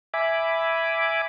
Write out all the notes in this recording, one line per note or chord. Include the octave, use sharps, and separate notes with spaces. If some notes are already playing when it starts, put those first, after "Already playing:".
E5 G#5 B5 D6